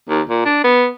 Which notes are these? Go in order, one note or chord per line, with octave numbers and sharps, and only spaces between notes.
D#2
A#2
D4
B3